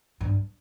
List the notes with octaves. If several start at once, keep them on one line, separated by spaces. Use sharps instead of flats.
G2